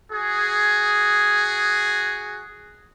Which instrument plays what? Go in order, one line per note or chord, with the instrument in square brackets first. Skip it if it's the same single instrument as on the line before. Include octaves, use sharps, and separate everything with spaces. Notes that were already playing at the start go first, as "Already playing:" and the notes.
[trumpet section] F#4 G#4